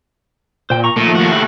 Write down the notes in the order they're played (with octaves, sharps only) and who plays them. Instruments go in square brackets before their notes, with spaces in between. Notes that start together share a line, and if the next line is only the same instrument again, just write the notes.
[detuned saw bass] A#2 [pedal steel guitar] C5 G5
[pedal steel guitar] A#5 C#6
[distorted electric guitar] A#2 [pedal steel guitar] D#3 F3 A#3 [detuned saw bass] A3
[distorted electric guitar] D#2 F#4
[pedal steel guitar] E4 F#5